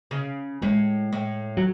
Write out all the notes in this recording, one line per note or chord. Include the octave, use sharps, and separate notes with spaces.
C#3
A2 G#3
A2
F#3